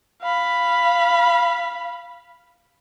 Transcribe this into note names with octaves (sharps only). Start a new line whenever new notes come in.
F5 B5